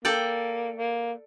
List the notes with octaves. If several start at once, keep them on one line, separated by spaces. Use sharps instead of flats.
A#3 A4 D5 G5
A#3